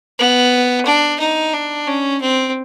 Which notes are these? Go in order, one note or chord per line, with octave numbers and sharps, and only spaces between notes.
B3
D4
D#4
D4
C#4
C4